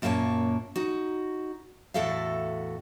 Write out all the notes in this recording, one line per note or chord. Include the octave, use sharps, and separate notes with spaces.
F#2 A#2 A#3 E4 C#5 A5
D#4 F#4
E2 A2 F#4 A4 E5 F5